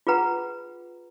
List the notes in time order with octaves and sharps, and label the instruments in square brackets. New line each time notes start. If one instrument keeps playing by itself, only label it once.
[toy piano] F4 G#4 B4 F#5 A#5